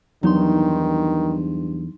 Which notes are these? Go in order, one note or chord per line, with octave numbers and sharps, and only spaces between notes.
E2 G2 D#3 F#3 D#4 C6